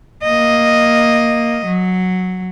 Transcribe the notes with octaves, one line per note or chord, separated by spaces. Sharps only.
A#3 D#5
F#3